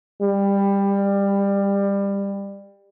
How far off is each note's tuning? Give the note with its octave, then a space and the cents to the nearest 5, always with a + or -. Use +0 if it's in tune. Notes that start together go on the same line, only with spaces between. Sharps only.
G3 +20